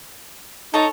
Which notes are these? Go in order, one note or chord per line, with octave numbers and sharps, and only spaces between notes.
D#4 A4 C#5 A5